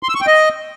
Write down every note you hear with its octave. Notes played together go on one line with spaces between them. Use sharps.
C6
E6
C#6
G5
D#5